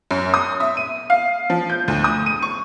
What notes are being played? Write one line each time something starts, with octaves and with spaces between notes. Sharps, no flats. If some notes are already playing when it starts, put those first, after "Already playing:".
F#2
D#6
E5
D#7
F5
F3
G6
D2
D#6
D#7
C#6